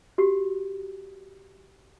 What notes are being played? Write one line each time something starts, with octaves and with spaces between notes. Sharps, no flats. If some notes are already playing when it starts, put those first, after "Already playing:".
F#4 G4